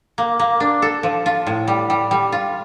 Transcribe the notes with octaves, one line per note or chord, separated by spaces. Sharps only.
A#3
A#3
D4
A4
F3
F4
A2
G3
G3
G3
F4